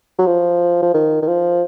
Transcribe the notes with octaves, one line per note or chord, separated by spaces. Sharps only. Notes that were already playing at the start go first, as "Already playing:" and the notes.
F#3
F3
F3
D#3
D#3
F3